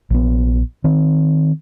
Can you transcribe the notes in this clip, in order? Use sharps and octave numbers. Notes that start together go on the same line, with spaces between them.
A#1 B3
D#3 C4